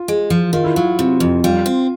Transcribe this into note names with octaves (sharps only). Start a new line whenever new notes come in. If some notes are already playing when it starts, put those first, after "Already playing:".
Already playing: F4
G#3
F3
D#3 F4
E4
F#3 F4
C3
F2
G3 F4
C4